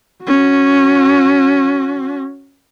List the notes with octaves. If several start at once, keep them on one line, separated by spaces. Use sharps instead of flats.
C#4 F#4